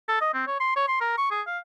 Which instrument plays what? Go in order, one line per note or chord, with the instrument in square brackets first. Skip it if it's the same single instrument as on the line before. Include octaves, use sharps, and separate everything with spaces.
[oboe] A4
D#5
C4
C#5
C6
C#5
C6
A#4
C#6
G#4
F5